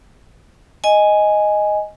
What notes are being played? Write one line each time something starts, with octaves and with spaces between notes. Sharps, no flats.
D#5 G#5